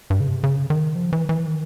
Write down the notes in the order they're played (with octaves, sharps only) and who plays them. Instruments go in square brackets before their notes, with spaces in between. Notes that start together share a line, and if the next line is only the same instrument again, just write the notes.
[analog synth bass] G2
C#3
C3
C#3
D#3
F3
E3
E3
D#3